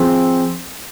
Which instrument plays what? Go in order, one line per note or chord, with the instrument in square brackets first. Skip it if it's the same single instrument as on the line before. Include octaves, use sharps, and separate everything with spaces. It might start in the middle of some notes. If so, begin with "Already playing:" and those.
Already playing: [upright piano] F3 C4 G#4